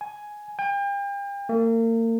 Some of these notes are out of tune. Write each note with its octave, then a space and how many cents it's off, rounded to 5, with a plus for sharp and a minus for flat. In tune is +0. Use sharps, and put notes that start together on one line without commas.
G#5 +10
G5 +40
A#3 -40